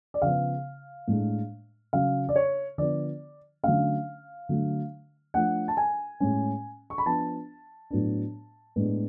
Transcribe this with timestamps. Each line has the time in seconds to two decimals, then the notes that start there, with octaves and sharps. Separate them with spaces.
0.14 D5
0.22 C#3 F3 B3 F5
1.08 A2 G#3 D4
1.93 C#3 F#3 C#4 F5
2.29 D5
2.36 C#5
2.78 D3 F3 B3 D5
3.63 D3 F#3 A3 C#4 F5
4.49 D3 F#3 A3
5.34 F3 A3 D4 F#5
5.68 A5
5.77 G#5
6.20 A2 G#3 C#4
6.90 C#6
6.98 B5
7.06 F3 B3 D4 A5
7.90 A2 F#3 B3 D4
8.76 A2 G#3 B3 D4